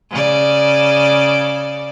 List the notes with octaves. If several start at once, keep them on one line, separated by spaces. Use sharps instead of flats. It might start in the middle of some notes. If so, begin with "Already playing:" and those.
C#3 D5